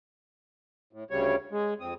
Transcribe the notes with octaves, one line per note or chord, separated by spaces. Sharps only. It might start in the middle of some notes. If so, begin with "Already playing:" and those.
A2
D2 C#3 G3 C#5
G#3
F2 C4 D#6